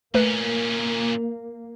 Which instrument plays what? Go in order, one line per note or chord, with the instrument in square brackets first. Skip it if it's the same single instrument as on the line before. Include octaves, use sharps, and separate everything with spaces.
[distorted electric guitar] A#2 C#4 [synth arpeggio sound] A3 B4 [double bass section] A#3